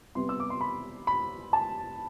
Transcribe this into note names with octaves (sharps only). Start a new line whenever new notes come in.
C3 G3 B3 C6
E6
D6
C6
B5
B5
A5